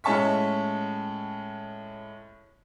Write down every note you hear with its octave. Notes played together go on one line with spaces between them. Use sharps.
A2 G#3 C#4 A5 C#6 B6